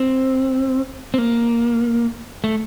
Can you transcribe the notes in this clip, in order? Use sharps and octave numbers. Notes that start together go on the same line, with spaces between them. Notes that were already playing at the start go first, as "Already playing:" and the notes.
Already playing: C4
C4
A#3
A3